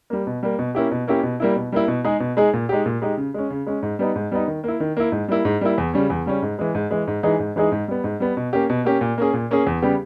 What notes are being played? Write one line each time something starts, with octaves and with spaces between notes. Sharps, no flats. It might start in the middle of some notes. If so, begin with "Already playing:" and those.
G3 A#3
B2
G3 A#3
B2
A#3 C#4 E4 G4
B2
A#3 C#4 E4 G4
B2
G3 A#3 E4
B2
G3 A#3 E4
B2
G#3 D#4 G#4
B2
G#3 D#4 G#4
A#2
G#3 D#4 G4
A#2
G#3 D#4 G4
C#3
G#3 C#4
C#3
G#3 C#4
G#2
G3 B3 D#4
G#2
G3 B3 D#4
D#3
A#3 E4
D#3
A#3 E4
G#2
G3 A#3 E4
G#2
G3 A#3 E4
E2
C#3 G3 C#4
E2
C#3 G3 C#4
G#2
E3 G#3
G#2
E3 G#3
G#2
E3 G#3 D#4 G#4
G#2
E3 G#3 D#4 G#4
G#2
G3 B3
G#2
G3 B3
B2
A#3 C#4 G4
B2
A#3 C#4 G4
A#2
A#3 C#4 G#4
A#2
A#3 C#4 G#4
E2
C#3 G3 B3 G4